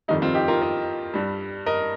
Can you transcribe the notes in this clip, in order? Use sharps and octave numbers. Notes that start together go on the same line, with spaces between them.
F2 D#3 G3 D#4
C4 F4
D#4 G4
F4 A#4
A#4 D#5
G2 G3
A#4 D#5